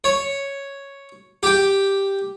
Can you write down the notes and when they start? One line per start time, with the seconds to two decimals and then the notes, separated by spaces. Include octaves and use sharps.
0.04 C#5
1.43 G4 G5